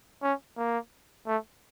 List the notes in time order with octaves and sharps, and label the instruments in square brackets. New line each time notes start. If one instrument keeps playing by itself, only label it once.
[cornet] C#4
A#3
A3